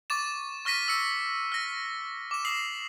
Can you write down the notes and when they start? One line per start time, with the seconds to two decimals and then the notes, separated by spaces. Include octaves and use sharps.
0.10 C#6 D6 A6 E7
0.65 C#6 F6 A#6 B6 D#7
0.88 E6 C#7
1.52 F6 A#6
2.31 D6 E7
2.45 D#6 C7 E7 F#7